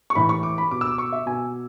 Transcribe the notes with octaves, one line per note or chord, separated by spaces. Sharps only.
C#6
A2 E3 B5
C#6
D6
B5
B2 D6
E6
D6
C#6
E5
B2 G#5